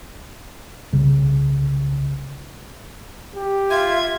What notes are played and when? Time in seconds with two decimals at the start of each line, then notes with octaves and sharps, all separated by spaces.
0.93 C2 C#3
3.35 G4
3.70 F4 E5 G#6